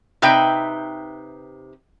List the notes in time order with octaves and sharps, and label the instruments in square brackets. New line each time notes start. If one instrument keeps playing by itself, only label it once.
[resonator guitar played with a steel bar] C3 D#4 B4 E5 G5